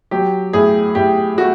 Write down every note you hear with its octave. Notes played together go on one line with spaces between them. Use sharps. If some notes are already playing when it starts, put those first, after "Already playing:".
F#3 G4
A2 G#4
A2 G4
A3 F#4